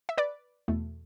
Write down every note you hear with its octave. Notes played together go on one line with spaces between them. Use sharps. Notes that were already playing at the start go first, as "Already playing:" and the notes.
E5
B4 D5
E2 B2 A3